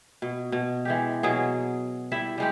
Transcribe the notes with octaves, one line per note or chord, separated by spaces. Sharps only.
B2
B2
E3 G#3 G4
B2 F#3 G#4
G3 E4 E5
G3 G#3 G4